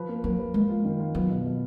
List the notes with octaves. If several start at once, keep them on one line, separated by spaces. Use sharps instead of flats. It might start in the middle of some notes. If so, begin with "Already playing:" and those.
Already playing: F3 B4
A#3
F#3 A#3
B4
G#3 A#3
F4
D#3
F4
F#3 B3
B2
B2